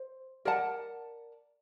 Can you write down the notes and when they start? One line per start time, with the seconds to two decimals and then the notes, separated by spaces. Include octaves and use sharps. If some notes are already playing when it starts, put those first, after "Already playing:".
Already playing: C5
0.45 A#4 D5 F#5 A5